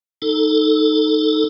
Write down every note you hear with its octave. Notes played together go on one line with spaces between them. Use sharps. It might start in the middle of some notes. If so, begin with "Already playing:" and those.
D#4 A4